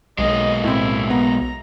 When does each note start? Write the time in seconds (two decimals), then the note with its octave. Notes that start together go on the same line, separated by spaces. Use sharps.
0.19 B1 G#3 A#3 D#5
0.64 A2 C4 E4
1.10 B3 A#5